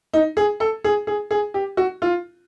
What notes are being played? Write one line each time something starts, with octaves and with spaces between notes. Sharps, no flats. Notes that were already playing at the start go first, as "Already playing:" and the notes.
D#4
G#4
A4
G#4
G#4
G#4
G4
F#4
F4